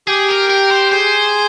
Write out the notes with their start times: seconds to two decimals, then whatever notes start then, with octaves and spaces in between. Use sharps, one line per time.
0.08 G4 G#4 G5
0.29 A#4
0.50 A#4
0.71 C5
0.91 G#4 C5 G#5